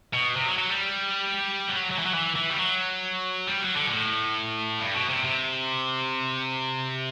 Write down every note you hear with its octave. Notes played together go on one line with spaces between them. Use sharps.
B2
C3
F#3
F#3
G3
F#3
F#3
E3
F#3
E3
E3
G3
F#3
G3
F#3
D3
B2
A2
G2
B2
C3
C3